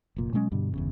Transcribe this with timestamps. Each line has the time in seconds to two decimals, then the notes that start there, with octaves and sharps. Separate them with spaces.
0.16 F1 A#2
0.33 B2 F#3 G#3 C#4
0.52 G2 B2 D3 G3
0.73 G1 E2 C#3